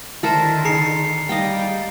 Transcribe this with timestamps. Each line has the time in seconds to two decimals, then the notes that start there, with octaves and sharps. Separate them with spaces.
0.23 D3 D#3 E4 A4 A#4 C5
0.65 D#4 G#4 A#5 C7 C#7
1.29 G3 D#5 F5 G5